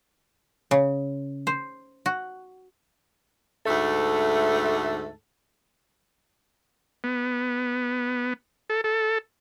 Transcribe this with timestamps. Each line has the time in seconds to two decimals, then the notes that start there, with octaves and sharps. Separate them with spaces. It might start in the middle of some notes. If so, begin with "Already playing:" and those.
0.71 C#3
1.47 C5
2.06 F#4
3.66 D2 G#2 A3 A4 E5
7.04 B3
8.70 A4
8.84 A4